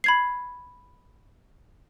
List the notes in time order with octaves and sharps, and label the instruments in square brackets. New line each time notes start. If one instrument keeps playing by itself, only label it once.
[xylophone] B5 G#6 C7